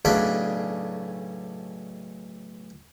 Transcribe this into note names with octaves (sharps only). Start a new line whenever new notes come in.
B1 A2 C#3 D4 G#4 B5